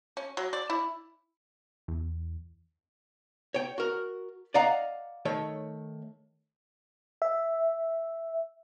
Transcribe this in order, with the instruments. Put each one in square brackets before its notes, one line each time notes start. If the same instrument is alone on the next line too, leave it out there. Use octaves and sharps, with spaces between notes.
[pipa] C#4
F#3
D5
E4
[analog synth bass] E2
[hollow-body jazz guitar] C#5 G5
F#4 A#4
D5 D#5 F5 F#5 A#5
D#3 A3 C#5
[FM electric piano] E5